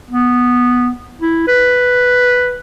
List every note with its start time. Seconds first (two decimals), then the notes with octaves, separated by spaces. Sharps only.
0.11 B3
1.21 E4
1.47 B4